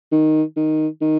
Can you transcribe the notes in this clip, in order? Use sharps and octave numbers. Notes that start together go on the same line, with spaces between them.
D#3
D#3
D#3